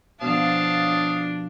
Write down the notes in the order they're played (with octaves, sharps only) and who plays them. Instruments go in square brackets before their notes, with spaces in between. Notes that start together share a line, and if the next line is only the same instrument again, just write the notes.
[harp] B2 F3 [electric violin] D4 [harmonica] F5 A5 D#6